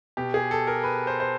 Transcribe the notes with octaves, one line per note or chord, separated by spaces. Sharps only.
B2 G4
G#4
A4
A#4
B4
C5
C5